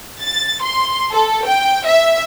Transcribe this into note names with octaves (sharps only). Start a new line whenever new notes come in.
A6
C6
A4
G5
E5